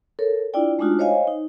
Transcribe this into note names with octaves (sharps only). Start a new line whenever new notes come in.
A4 A#4 C#5
D4 E4 F4 D5 G5
G#3 A3 D4 D#4 F4 F#4
C5 C#5 D#5 F5 G#5
D#4